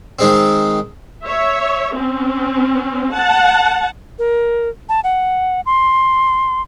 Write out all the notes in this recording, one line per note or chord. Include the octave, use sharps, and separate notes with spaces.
D#3 G#3 C4
C#5 E5
C4 C#4
F#5 A5
A#4
A5
F#5
C6